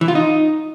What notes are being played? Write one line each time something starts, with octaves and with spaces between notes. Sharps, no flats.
E3
F4
D#4